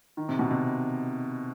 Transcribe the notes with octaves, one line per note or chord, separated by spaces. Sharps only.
D#3
C3
B2
C3